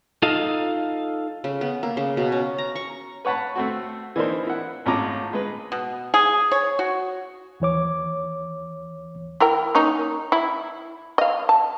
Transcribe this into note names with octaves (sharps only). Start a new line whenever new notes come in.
D#4 F4 A4 D#5 F5
C#3
B3
A#3
C#3
B2
C#4
A#5
C#6
B4 C#5 F#5 A5 B5
A3 C4 F#4
E3 A#3 D4 D#4 A#4 C5
E4 F#5
G#1 A2 C#4 F4 A#5 D6
G#3 B4
B2
G#4
C#5
F#4
D#2 E3 C#5 D6
E4 A#4 G5
A#3 C#4 D#4
E4
D#5 F5
A5